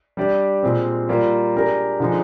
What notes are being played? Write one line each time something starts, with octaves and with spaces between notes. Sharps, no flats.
G3 D4 G4 D5
A#2 G#3 C4
G3 A#3 F4
G#3 D4 G4 A#4 D5
D3 F3 G#3 D#4